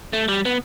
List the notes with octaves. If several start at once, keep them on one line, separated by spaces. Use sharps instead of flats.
A3
G3
B3